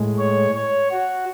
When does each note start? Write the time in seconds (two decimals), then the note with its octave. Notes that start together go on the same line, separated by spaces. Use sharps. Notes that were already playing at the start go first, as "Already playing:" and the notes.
Already playing: A2 G#3
0.18 C#5
0.55 C#5
0.91 F#4